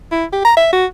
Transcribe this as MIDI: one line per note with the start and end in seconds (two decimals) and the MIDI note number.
0.11 0.25 64
0.32 0.43 67
0.45 0.55 82
0.57 0.68 76
0.73 0.85 66